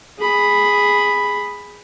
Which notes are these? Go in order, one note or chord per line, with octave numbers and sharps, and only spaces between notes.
G#4 B5